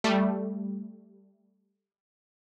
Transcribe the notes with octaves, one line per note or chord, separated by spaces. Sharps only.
G3 A3